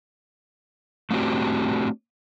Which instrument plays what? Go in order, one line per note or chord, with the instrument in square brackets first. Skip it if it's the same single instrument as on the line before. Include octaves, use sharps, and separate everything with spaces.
[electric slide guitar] A3 C4 D4 F#4 G4